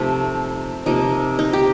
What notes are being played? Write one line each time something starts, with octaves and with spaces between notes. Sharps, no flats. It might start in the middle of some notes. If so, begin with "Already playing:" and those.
Already playing: C3 F3 A3 D#4
C3 F3 A#3 D#4
D#4
G4